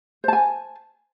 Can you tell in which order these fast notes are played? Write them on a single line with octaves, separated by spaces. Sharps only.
C5 A5 G#5